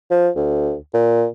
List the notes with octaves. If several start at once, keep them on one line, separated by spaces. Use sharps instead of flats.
F3
D2
A#2